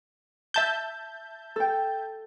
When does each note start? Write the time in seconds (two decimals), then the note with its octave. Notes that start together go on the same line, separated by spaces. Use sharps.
0.54 E5 A5 G6
1.56 A4 G5